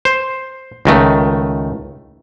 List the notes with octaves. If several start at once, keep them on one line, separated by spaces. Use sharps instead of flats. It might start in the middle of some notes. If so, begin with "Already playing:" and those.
C5
C#2 D#3 A3